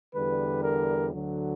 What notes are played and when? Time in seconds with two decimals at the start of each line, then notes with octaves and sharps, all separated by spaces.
0.15 E2 D3 G3 B4
0.63 A#4
1.13 D2 D3 F#3